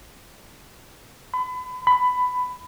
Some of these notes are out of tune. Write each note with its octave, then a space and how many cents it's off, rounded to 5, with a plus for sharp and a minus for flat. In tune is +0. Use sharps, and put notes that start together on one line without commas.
B5 +35
B5 +15